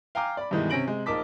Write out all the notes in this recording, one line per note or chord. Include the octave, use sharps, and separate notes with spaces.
F5 G5 G#5 A#5 D6
D5 B5
G2 B2 D#3 E3 G#3
C3 C#4 A#6 D7 F#7
C3 G#3
A#1 D#4 A#4 A5 D6 B6